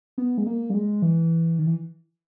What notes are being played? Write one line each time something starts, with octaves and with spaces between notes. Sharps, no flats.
B3
G#3
A#3
G3
G#3
E3
D#3
E3